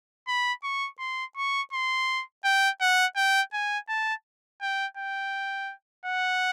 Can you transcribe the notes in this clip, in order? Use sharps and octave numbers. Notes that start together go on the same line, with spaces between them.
B5
C#6
C6
C#6
C6
G5
F#5
G5
G#5
A5
G5
G5
F#5